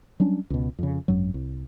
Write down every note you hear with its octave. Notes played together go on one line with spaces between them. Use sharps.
F#3 G3 C#4 D4
C#2 B2
F2 C#3
G#1 F#2 F#3
C2